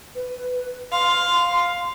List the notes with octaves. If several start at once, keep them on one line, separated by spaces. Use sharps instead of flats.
B4
F5 C6